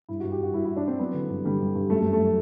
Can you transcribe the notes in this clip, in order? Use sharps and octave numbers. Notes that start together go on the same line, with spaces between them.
G2 E4
F#4
G2
G4
G2 F#4
G2 E4
E4
E3
D4
E3 C4
F#3 B3
D3
G2
D3 G3
G2
G2
F#2 A3
A3
F#2
A3
F#3